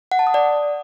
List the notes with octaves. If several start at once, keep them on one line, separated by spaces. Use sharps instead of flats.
F#5
A5
D#6
D5